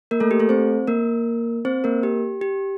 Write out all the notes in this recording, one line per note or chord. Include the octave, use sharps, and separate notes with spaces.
A#3 A#4
A3 A4
G4
A3 A4
C4 C5
A#3 A#4
C4 C5
A#3 A#4
G4
G4